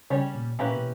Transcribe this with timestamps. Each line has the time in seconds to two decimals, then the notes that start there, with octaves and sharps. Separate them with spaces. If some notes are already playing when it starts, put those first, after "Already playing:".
0.10 C#3 G3 C#4 G4 C#5
0.35 A#2
0.59 A#2 E3 A#3 C#4 G4 B4
0.75 B2